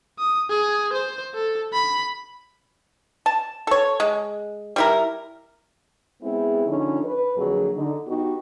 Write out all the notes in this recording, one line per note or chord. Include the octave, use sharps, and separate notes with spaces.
D#6
G#4
C5
A4
B5
A5
A4 C#5
G#3
G3 E4 A#4
G#3 B3 C4 E4 G#4
D3 F3 C#4 D#4
B4
F2 D3 F#3 A#3 G#4
D3 D#4
B3 D#4 F#4 G4